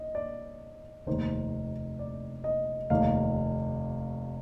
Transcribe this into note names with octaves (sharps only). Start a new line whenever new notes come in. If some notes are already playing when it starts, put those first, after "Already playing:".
Already playing: D#5
D5
F1 D#2 D#3 C5
D5
D#5
F1 D#2 D#3 F5